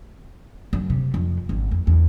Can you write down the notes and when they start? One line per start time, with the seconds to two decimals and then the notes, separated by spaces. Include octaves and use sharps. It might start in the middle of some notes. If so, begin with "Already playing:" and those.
0.73 F#2
0.90 C3
1.14 F2
1.49 G#1
1.72 F2
1.87 E2